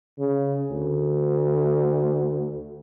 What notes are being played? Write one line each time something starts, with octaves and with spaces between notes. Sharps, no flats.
C#3
D2